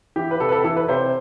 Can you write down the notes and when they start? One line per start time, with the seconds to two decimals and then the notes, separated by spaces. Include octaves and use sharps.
0.16 E3 G4
0.31 B4
0.40 C3 A4
0.49 B4
0.52 A4
0.64 E3 A4
0.76 B4
0.88 C3 C5